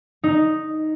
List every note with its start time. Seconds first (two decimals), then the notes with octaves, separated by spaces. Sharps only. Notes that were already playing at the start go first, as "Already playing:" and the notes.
0.23 D#4